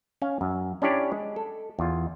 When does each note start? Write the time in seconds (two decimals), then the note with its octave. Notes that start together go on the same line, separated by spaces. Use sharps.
0.22 C#4 F5 G#5
0.41 F#2
0.82 C#4 D4 E4 G4 C#5 D5
1.12 G#3
1.36 A4
1.79 E2 F4